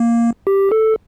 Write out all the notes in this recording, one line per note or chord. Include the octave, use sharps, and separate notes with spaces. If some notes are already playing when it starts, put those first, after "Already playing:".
Already playing: A#3
G4
A4